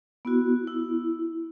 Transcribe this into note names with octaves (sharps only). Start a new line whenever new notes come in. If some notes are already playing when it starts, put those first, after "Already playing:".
B3 E4 F#4
E4